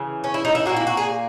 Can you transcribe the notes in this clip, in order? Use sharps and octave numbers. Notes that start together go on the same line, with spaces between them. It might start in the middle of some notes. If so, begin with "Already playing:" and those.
Already playing: C#3 E3
C#4
E4
D#4
E4
A#2 A#3 F#4
E4
F#4
G#4